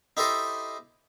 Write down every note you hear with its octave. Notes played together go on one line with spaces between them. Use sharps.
D#4 E4 G4 A4 C5 D#5